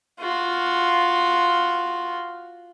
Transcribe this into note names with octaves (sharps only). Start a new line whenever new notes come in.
F4 F#4